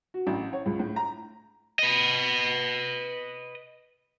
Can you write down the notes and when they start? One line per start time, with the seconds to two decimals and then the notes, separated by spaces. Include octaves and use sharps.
0.14 F#4
0.27 A1
0.53 C#5
0.66 C#2
0.79 A2
0.96 A#5
1.79 B4 D#5